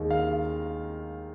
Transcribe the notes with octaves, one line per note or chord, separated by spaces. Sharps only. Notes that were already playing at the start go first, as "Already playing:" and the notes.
Already playing: D#2 D#3 G#3
F5